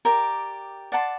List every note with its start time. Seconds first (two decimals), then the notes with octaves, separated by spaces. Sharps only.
0.05 G4 A#4 D5 G5
0.92 D5 F#5 A5 C6